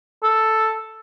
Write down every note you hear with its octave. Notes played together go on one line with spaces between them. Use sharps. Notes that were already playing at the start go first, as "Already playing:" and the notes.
A4